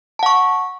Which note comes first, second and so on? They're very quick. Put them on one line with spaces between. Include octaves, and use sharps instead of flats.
A5 F#5 C#6